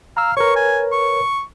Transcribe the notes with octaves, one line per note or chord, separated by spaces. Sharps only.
F5 A#5 E6
A#4 B4 C#5 C#6
G#5
C#6